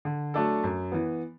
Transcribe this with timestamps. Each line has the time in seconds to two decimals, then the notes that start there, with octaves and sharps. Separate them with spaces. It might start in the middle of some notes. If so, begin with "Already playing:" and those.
0.05 D3
0.34 F#3 A3 D4 A4
0.64 F#2
0.92 E3 B3